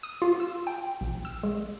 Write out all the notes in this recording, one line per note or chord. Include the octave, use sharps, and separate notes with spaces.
D#6
F4
E6
G5
A#1
E6
G#3